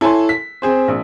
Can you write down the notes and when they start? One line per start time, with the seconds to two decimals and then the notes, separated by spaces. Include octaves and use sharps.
0.01 E4 A4 C#5 G#5 A5 C6
0.29 B6
0.62 C4 G#4 C5
0.88 A#1